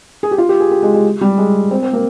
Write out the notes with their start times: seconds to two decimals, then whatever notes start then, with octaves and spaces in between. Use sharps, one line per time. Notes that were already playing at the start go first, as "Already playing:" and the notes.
0.23 G#4
0.31 G4
0.38 F4
0.49 G4
0.60 G#4
0.72 G4
0.83 G#3
0.94 G#3
1.21 G3
1.38 G#3
1.71 C4
1.83 C4
1.93 A#3